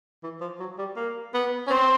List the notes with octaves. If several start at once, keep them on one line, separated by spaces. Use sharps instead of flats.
E3
F3
F#3
G3
A#3
B3
C#4
C4 C6